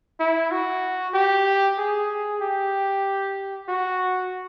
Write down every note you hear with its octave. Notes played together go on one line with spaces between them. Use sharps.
E4
F#4
G4
G#4
G4
F#4